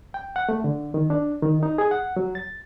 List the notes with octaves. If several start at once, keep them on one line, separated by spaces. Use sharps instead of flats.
G5
F#5
A3
D3
D#3
D4
D#3
D#4
G#4
F#5
F#3
A6